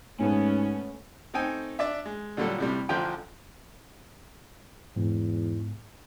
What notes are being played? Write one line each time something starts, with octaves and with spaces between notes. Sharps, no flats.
G#2 A3 B3 C#4
A3 C4 D#4 A4 G5 G#5
D4 D5 E5
G#3
A#2 D3 F#3 G3 A4
A2 C3 G3
A1 D3 F3 G5 C6
E2 G#2